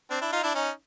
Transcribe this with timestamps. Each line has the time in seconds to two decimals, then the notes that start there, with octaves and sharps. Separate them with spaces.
0.10 C4 D4
0.21 D4 E4
0.32 D#4 F4
0.43 D4 E4
0.54 C#4 D#4